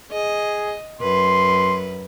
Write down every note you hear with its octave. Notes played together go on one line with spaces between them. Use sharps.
G#4 D#5
F#2 B4 C6